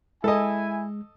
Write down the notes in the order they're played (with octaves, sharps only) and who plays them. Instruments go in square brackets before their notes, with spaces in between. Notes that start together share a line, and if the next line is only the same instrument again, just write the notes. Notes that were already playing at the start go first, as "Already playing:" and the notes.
[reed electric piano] G#3 [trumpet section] E4 G#5 [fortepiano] A4 D#5